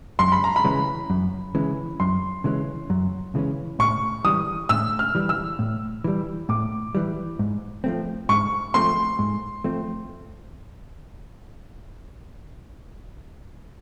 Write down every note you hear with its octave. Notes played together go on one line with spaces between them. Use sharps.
F#2 C6
B5
A#5
B5
C#3 E3 G#3 C#4
F#2
C#3 E3 G#3 C#4
F#2 C6
C#3 E3 G#3 C#4
F#2
C#3 E3 G#3 C#4
A2 C#6
E3 G3 D#6
A2 E6
F6
E3 G3
E6
A2
E3 G3
A2 D6
E3 G3
G#2
F3 A3 C4
G#2 C#6
F3 A3 C4 C6
G#2
F3 A3 C4